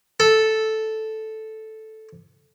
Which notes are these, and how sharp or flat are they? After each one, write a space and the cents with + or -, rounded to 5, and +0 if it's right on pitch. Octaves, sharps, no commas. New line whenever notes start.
A4 -5